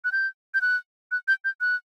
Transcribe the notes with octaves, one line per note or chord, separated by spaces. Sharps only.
F#6
G6
G6
F#6
F#6
G6
G6
F#6